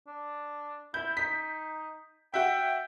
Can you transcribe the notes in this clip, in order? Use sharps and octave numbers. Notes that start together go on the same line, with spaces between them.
D4
E4 G6
D#4 B6
F#4 E5 G5